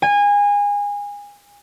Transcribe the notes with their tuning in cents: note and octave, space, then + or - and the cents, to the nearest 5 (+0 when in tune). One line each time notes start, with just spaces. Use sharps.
G#5 -25